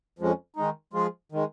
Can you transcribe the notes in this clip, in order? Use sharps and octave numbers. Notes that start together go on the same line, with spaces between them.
F2 F3 G#3 C#4
D#3 G#3 D#4
F3 G#3 F4 G#4
D#3 G#3